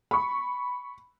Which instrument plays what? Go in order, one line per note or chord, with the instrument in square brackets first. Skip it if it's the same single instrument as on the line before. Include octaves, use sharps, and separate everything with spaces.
[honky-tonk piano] B5 C#6